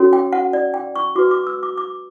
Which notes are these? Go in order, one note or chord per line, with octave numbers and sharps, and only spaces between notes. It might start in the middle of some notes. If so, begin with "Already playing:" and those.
Already playing: C#4 F#4 A4 C#5
G5
F#5
D5
G5
C#6
F#4 B4 D6
D6
E6
D6
D6